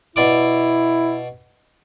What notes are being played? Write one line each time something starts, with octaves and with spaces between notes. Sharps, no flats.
B2 E4 D5 D6